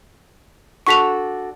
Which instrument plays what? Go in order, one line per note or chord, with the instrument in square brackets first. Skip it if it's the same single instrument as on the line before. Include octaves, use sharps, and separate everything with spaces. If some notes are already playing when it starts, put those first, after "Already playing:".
[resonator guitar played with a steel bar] D4 F#4 A4 [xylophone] C#6 B6 F7